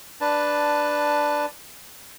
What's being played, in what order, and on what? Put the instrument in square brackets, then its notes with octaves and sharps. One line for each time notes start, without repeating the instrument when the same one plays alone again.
[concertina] D4 B4 A5